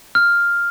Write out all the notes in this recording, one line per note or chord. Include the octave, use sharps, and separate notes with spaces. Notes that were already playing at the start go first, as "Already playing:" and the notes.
F6